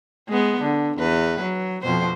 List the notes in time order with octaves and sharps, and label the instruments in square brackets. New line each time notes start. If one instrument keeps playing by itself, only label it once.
[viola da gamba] G#3 B3
D3
E2 B4
F#3
F2 B2 C5